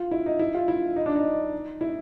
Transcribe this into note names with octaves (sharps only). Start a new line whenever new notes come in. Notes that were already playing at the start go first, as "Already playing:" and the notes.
Already playing: F4
E4
D#4
E4
F4
E4
D#4
D4
D#4
E4